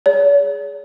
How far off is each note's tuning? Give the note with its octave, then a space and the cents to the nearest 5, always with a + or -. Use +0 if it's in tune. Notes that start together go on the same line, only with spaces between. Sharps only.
G#4 +0 C#5 +45